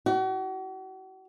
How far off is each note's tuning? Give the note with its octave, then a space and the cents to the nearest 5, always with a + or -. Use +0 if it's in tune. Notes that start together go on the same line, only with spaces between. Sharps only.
F#4 +40